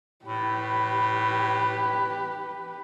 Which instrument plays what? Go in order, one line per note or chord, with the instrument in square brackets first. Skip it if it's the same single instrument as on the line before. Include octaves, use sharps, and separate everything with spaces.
[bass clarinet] A2 [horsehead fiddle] G4 B4